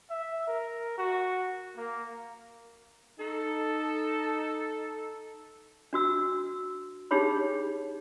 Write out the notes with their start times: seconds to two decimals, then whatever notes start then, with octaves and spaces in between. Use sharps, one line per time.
0.10 E5
0.47 A#4
0.98 F#4
1.77 A#3
3.19 D#4 A4
5.93 D4 F#4 E6
7.11 D4 D#4 G4 G#4 C#5 B5